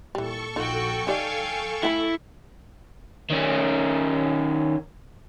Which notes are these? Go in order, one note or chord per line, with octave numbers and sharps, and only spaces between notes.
A#2 E3 G3 A4 C#6
A#1 D#4 F4 F#4 G5
D#4 G4 D5 F5 G5 G#5
A3 E4 F#5 B5
D#3 C#4